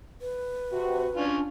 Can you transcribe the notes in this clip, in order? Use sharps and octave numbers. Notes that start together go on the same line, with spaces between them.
B4
C3 F#4
C#4 D4 F4